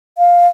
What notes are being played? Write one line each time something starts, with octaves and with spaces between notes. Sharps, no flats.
F5